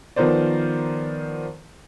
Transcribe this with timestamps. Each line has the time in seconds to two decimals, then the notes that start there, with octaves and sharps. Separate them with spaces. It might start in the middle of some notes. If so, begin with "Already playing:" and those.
0.16 D#3 F3 B3 A#4 C5 D5